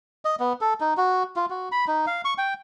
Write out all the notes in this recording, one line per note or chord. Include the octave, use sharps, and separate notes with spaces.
D#5
B3
A4
D#4
F#4
F4
F#4
B5
D#4
F5
C#6
G5